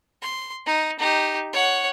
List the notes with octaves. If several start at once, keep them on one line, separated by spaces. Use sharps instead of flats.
C6
D#4
D#4 G4
C#5 F#5